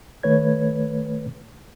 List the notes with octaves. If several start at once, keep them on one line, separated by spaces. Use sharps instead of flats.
D#3 A3 B4 C#5 G#6